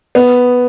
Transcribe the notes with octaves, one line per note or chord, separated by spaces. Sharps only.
B3